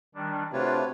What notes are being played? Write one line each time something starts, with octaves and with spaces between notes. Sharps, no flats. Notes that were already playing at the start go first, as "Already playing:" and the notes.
D#3 G3 D4
C3 A3 D4 F4 F#4 B4 C#5